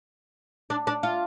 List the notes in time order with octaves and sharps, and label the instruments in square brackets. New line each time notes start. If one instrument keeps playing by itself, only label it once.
[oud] D4
D4
F4